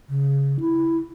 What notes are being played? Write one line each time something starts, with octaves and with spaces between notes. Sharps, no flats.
C#3
E4